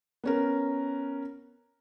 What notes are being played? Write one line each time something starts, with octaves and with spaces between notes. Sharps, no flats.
B3 C#4 A#4